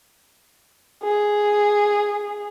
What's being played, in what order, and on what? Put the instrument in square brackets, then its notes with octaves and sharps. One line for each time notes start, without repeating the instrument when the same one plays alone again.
[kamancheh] G#4